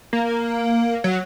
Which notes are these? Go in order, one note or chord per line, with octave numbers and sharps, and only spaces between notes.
A#3
F#3